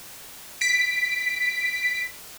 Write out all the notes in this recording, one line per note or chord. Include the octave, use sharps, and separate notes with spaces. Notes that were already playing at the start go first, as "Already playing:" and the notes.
B6 D7